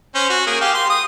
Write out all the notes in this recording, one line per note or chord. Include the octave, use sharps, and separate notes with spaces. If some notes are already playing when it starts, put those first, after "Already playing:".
C#4 C5
F#4
A#3 G#4
G4 F5
C6
D#6